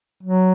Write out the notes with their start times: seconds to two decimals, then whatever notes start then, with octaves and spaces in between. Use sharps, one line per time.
0.23 F#3